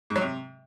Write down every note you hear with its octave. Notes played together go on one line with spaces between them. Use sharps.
G#2
F#3
C3